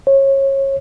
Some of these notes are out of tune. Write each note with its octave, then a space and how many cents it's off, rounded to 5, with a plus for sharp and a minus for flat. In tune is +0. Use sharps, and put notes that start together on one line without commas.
C#5 -25